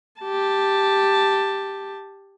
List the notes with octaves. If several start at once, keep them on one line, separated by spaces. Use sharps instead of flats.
G4 A5